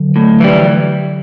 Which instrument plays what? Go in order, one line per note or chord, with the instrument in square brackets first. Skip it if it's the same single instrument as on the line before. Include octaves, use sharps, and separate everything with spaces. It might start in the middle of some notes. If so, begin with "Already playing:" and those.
Already playing: [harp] D3 F#3
[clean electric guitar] A2
E3 G3